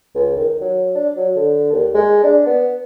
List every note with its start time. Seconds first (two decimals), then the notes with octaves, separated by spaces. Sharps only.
0.15 C#2
0.36 D#3
0.61 F#3
0.95 D4
1.16 F#3
1.36 D3
1.72 D#2
1.95 G#3
2.23 D4
2.46 B3